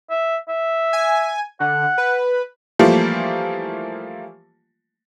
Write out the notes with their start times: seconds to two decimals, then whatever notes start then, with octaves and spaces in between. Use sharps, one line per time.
0.10 E5
0.48 E5
0.93 G#5
1.60 D3 F#5
1.98 B4
2.79 E3 F3 G3 A3 A#3 F4